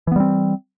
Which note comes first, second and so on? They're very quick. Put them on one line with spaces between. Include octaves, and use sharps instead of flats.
E3 B3 G3 C4